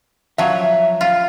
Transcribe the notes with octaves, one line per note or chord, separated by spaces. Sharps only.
F3 F#3 E5
F4